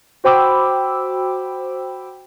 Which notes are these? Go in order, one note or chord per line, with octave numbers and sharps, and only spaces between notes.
F#4 C5 G5 B5 D6 E6